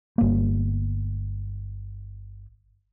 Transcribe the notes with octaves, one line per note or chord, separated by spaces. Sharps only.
G1 A#3